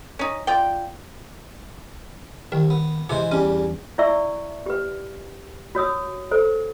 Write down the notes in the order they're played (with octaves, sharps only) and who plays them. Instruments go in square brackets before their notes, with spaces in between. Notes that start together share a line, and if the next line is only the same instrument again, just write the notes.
[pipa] C#4 D#4
F4 D5 G5
[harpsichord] C2 [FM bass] D#3
[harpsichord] B3
[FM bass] C3 [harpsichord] E3 G#3 C5
[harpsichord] E2 G3 [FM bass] C#4
[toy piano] E4 D5 E5 C#6 E6
G4 B4
F#4 C#5 D#6 E6
A4 C5